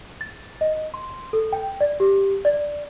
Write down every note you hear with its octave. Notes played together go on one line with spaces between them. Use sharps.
A6
D#5
C6
A4
G5
D5
G4
D5